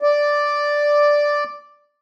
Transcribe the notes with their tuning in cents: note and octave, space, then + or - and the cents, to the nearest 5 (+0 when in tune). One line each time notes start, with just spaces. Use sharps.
D5 +0